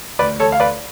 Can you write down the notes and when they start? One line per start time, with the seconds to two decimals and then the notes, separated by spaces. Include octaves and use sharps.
0.19 D2 B4 D5
0.40 A4 C#5
0.46 D2
0.52 F5
0.60 B4 D5